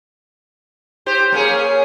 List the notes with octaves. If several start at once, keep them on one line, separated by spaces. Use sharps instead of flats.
G4 C5
A#3 C#4 G#4